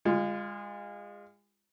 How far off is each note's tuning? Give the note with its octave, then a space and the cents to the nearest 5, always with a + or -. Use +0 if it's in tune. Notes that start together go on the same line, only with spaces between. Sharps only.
G#3 -30 F4 +0